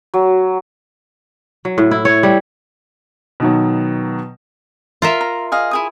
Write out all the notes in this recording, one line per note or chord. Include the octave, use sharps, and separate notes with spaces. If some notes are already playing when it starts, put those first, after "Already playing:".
F#3
F#3
A2
E4
C#5
G3
B2 D#3 F#3
F4 A#4 E5
A#5
G#4 D#5 F5
E4 G#4 D#6